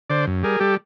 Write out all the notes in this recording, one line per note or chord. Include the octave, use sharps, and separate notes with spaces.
D3 C5 D5
F#2
G3 G#4 A#4
G3 G4 A4